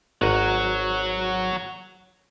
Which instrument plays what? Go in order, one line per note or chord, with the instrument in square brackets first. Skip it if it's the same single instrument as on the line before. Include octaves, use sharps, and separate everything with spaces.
[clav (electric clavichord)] G#1 D#5 [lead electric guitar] F#3 F#4